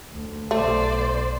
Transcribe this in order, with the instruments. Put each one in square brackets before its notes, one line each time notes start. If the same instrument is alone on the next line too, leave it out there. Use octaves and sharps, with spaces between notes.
[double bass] D2
[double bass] B1 [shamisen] A3 [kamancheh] C5 D5